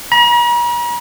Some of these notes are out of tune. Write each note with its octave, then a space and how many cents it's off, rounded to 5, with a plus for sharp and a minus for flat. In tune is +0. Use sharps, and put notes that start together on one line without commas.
A#5 +45